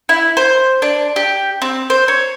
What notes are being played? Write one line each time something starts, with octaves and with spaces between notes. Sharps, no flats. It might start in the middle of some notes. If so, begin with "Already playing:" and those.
E4
C5
D4
G4
C4
C5
C#5